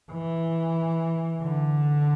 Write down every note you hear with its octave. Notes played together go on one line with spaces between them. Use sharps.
E3
D3